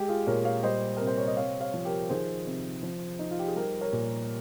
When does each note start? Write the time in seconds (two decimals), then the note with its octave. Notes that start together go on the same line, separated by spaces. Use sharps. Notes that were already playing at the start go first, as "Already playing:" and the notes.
Already playing: G#3 G4
0.08 F4 G#4
0.27 A#2 A#4 C#5
0.45 C#5 F5
0.63 G3 C5 D#5
0.97 C3 A#4
1.07 C5
1.17 C#5
1.27 D#5
1.36 C4 C#5 F5
1.61 C#5 F5
1.74 F3
1.85 G4 A#4
2.10 D#3 G#4 C5
2.46 C3
2.83 F3
3.19 D#4
3.31 F4
3.39 G4
3.48 G#4
3.56 G3 G4 A#4
3.81 A#4 C#5
3.92 A#2